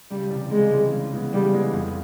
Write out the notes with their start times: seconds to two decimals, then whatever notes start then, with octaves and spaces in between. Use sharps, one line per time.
0.11 C#2 G3
0.31 C3 E3 G3
0.51 C#2 G#3
0.72 C3 E3 G3
0.92 C#3
1.13 E3 G#3 B3
1.33 C#3 G3
1.53 E3 G#3 B3
1.73 F2